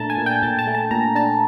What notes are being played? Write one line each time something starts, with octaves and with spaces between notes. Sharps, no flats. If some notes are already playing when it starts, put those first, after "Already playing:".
Already playing: A#2 A3 D4 A5 A#5
G#5
A#2
G5
A#2 A5
A5
A3
A5
A#2 A#5
D4 A5